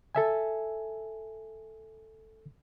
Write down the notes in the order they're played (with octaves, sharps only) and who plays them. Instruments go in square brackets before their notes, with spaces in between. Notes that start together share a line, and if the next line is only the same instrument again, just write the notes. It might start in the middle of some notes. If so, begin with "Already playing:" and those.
[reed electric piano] A4 E5 G#5